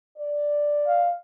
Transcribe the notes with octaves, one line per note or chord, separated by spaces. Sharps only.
D5
F5